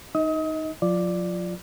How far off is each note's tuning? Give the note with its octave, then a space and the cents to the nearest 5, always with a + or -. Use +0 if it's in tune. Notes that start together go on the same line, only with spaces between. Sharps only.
D#4 +0 D#5 +30 D#6 +35
F3 +45 F4 -15 D5 +0